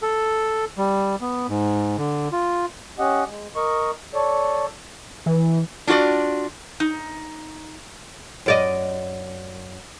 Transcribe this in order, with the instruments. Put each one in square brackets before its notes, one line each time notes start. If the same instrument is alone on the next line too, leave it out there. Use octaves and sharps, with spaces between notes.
[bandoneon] A4
G3
B3
G#2
D3
F4
[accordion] C#4 G4 D#5 F#5
G#3
A#4 D#5 C#6
A4 C#5 D5
[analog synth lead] E3
[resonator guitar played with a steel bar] D4 F4 F#4 A#4 D5
D#4
[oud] F#2 D5 D#5